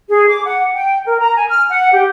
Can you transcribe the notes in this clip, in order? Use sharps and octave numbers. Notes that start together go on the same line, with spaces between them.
G#4
D6
F#5
G5
A#4
A#5
G#5
F6
F#5
G4